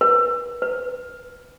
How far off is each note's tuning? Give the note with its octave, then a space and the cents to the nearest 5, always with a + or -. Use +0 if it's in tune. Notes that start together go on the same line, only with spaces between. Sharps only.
B4 -30
B4 +25